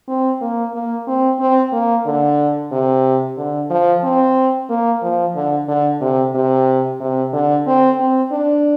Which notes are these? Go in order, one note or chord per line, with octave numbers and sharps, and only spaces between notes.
C4
A#3
A#3
C4
C4
A#3
D3
C3
D3
F3
C4
A#3
F3
D3
D3
C3
C3
C3
D3
C4
C4
D4